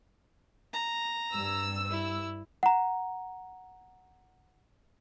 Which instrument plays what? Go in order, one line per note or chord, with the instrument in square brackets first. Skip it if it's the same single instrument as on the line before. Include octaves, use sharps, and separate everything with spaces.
[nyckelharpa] A#5
[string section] G2 E6
[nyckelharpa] E4
[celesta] F#5 A#5